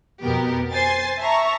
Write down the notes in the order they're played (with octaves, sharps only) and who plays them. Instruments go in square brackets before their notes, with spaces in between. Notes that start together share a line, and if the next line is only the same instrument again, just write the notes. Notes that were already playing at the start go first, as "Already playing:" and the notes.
[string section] F2 B2 B3 G4 A#4
C5 G#5 A6 C7
E5 A5 A#5 C#6